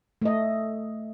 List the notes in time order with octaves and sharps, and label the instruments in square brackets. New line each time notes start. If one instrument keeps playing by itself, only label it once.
[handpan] A3 D#5